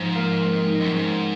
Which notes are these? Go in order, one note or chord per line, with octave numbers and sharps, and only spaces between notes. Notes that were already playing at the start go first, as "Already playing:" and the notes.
Already playing: G#2 F3
A#3
C4
D#4
F#2
G#2 C#4
C4